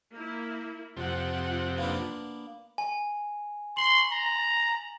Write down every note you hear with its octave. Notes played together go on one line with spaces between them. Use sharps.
A#3 E4
F2 C3 F4 F#5
A#3 B3 D4
G#5
C6 F#7
A#5